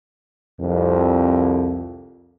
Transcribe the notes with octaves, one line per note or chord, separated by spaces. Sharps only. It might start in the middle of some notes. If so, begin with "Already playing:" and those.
C2 F2